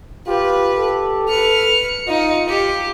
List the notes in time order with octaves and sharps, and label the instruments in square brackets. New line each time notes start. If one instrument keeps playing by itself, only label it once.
[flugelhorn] F4 [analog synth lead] G4 [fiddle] B4
[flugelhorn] A4
[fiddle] B4 F6 [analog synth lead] C#7
[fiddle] D#4 [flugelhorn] F4
[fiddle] G4